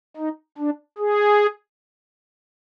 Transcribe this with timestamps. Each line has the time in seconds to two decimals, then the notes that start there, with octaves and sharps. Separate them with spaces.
0.17 D#4
0.58 D4
0.98 G#4